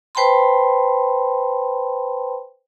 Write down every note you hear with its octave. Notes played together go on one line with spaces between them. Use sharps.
B4 C5 G5 A5 B5 C6